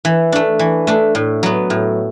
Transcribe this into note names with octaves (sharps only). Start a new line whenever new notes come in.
E3
A3 D4
E3
A3 D4
A2
F#3 B3
A2